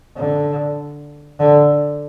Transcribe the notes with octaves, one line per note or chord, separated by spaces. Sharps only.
D3
D3